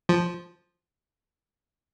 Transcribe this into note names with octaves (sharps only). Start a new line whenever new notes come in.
F3